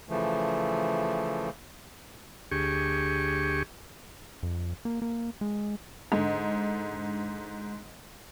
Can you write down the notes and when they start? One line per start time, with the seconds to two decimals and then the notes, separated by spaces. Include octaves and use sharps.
0.09 C#3 E3 F3 A3
2.51 D2 G4 G#4 C#6
4.43 F2
4.85 A#3
5.02 A#3
5.41 G#3
6.12 G#2 D3